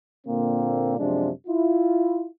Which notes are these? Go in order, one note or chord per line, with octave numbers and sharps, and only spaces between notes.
A#2 D3 A#3 C4
F#2 C3 F3 G#3 D4
E4 F4